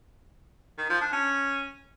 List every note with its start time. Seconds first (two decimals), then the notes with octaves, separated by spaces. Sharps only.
0.78 D#3
0.90 F3
1.01 D4
1.13 C#4